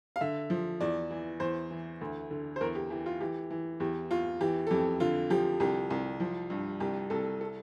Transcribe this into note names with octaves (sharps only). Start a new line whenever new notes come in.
F5
D3 E5
F3
E2 D5
E3
E2 C5
E3
D2
D3
C5
E2 A#4
G4
E3 G4
F4
E3 G4
E3
E2 G4
E2 F4
E3 G4
A4
F2 G4
D3 F4
F3 G4
C2 G4
C2
F3
G2
C2 G4
C2 A4
A4